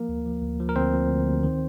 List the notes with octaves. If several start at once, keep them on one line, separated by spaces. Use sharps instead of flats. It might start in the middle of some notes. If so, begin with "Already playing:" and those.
Already playing: F3 A#3 A#4
D2
F3
D2
F3
A#4
D2 C4 C5
F3
D2
D2
D#3